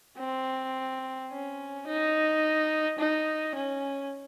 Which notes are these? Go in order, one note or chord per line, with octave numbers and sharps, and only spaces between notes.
C4
C#4
D#4
D#4
C#4